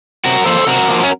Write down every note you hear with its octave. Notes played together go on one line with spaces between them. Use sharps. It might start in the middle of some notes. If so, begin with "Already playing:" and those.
C3 F#4 A#4
F3 A#3 A4 C5
C3 F#4 A#4
F3 A#3
C#4